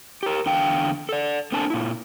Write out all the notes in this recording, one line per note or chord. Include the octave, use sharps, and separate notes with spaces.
G4 A#4
E2 D3 F5 G5
A4 D5
A#3 C4 D4 A4 G#5 A5
A#2 E4